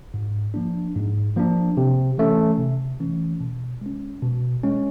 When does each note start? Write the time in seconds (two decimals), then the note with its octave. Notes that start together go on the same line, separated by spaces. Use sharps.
0.14 G#2
0.54 F3 A#3 D4
0.95 G#2
1.36 F3 A#3 D4
1.77 C3
2.18 E3 A3 C#4
2.59 C3
3.00 E3 A3 C#4
3.40 B2
3.81 G#3 C#4
4.22 B2
4.63 G#3 C#4